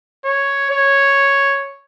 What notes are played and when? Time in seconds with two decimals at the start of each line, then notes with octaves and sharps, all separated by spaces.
0.25 C#5
0.71 C#5